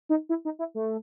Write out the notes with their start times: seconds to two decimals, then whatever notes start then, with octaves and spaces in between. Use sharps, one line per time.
0.09 D#4
0.29 E4
0.45 D#4
0.59 E4
0.75 A3